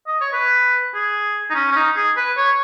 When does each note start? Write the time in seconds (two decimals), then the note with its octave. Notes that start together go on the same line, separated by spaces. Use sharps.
0.07 D#5
0.21 C#5
0.33 B4
0.95 G#4
1.50 D#4
1.55 C#4
1.71 C#4
1.76 D#4
1.96 G#4
2.16 B4
2.37 C#5